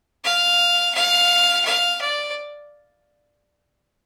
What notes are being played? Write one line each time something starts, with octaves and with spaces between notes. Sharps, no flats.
F5
F5
F5
D5